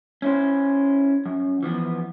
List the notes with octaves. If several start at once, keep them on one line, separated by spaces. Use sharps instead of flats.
C#4 E4 C5
F#2
E3 F3 B3